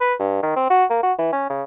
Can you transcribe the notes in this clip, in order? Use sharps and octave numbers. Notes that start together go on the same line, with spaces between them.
B4
G2
D#3
C4
F#4
A#3
F#4
E3
C#4
C#3